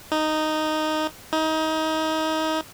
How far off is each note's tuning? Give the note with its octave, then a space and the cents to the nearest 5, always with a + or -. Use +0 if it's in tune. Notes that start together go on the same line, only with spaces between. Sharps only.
D#4 -5
D#4 +25